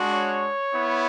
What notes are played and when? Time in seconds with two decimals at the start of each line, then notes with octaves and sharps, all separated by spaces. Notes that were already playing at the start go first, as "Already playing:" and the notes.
Already playing: G#3 D4 F#4
0.10 C#5
0.74 B3 E4